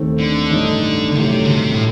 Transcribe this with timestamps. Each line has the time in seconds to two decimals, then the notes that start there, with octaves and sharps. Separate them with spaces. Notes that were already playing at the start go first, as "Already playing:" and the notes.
Already playing: D#2 D#3 A3 C4 D#4
0.19 D3
0.51 A1 G2 D#3 A3 D#4
1.11 D3
1.17 A1 G2 C3 D#3 F#3 A3
1.45 D3
1.50 C3
1.74 A2